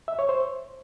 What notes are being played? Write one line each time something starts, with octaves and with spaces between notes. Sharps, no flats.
E5
C#5
C5